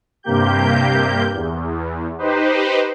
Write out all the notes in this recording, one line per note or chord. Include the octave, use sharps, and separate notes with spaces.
G2 C3 A#3 G4 G6
E2
D#4 G4 B4 C5